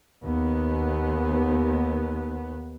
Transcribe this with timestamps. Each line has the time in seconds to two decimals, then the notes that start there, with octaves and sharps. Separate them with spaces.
0.24 D#2 B3